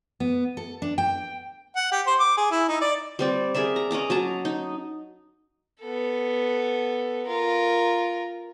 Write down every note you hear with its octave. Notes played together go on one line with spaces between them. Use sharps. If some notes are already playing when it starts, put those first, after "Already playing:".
B3
A4
D4
G5
F#5
G4
C5
D6
G#4
E4
D#4
D5
G3 C4 D5
G#4 A#4 D5 E5
A#5
C#4 D#5 A#5 D6
F#3 A5 A#5
D#4
B3 A4
F4 A#4